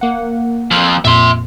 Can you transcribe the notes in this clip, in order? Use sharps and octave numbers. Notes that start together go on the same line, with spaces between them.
A#3 F#5
F2 F3
F2 A#2 E5 C6